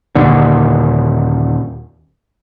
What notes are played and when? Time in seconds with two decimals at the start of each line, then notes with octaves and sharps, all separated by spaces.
0.15 D#2 A#2 D3